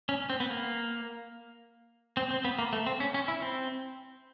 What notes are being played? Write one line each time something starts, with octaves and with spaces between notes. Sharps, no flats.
C#4
C4
B3
A#3
C4
C4
B3
A#3
A3
C4
C#4
C#4
E4
C4